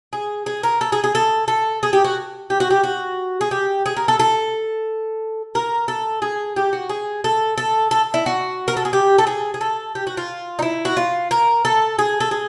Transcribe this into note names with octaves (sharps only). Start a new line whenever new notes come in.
G#4
G#4
A#4
A4
G#4
G#4
A4
A4
G#4
G4
F#4
G4
F#4
G4
F#4
G#4
G4
G#4
A#4
A4
A4
A#4
A4
G#4
G4
F#4
G#4
A4
A4
A4
E4
F#4
A#4
A4
G#4
G4
A4
G#4
G#4
A4
G4
F#4
F4
D#4
E4
F#4
F4
A#4
A4
G#4
A4
G#4